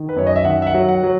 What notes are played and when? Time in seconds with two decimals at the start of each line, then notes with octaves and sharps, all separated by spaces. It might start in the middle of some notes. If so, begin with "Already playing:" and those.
Already playing: D#3
0.09 B4
0.16 F#2 C#5
0.27 D#5
0.36 E5
0.45 D#3 F#5
0.62 E5
0.67 F#5
0.74 F#3
0.89 F#5
1.03 F#3